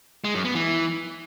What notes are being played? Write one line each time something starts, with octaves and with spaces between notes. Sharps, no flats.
G#3
F#2
B3
E3